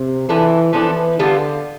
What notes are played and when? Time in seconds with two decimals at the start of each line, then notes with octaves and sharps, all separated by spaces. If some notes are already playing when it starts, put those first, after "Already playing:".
Already playing: C3
0.28 E3 F3 B3 D4 A4
0.73 E3 F3 B3 D4 A4
1.19 D3 G3 B3 F4 A4